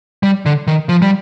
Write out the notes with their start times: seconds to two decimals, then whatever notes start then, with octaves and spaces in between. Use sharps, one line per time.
0.23 G3
0.46 D3
0.67 D#3
0.89 F3
1.02 G3